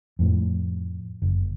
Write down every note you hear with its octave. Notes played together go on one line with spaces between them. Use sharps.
F2 A2
F#1